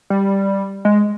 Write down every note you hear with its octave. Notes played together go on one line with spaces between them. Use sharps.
G3
G#3